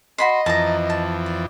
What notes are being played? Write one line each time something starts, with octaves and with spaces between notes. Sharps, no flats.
F#4 D#5 B5 C6
F2 E3 A5 A#5
A5
D5